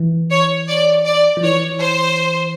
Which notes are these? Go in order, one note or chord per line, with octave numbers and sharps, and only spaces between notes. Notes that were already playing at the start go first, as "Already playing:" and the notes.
Already playing: E3
C#5
D5
D5
F3
E3 C#5
C5